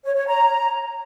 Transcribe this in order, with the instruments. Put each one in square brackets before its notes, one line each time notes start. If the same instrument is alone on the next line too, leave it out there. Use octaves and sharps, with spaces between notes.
[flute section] C#5
C#5
A#5